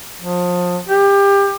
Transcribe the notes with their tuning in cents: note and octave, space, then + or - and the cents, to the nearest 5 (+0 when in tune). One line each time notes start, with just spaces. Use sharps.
F3 +30
G4 +25